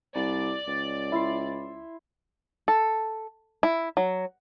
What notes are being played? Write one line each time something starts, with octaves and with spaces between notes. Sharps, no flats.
C2 D5
C#2
E4 C6
A4
E4
F#3